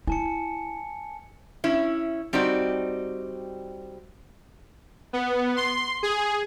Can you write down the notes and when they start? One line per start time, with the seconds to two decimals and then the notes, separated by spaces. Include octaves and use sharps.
0.07 E4 G#5 A5 C#7
1.64 C#4 E4
2.33 G3 C4 D#4 F#4 D5
5.13 B3
5.56 C6
6.03 G#4